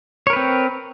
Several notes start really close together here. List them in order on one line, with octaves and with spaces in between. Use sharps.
C#5 A#4 B4 C4